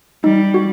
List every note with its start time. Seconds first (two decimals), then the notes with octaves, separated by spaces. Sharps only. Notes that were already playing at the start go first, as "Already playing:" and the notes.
0.24 G3 D#4
0.54 F#4